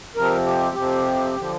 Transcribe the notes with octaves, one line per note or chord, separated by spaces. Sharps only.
F2 C3 F3 C4 A#4
G4
F2 C3 F3 C4
D3 F3